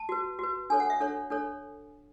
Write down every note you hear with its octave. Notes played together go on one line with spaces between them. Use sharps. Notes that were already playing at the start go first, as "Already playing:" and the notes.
Already playing: A5
F#4 B4
F#4 B4
D4 A4 C#5 G#5
F#5
E5
D4 A4 C#5
D4 A4 C#5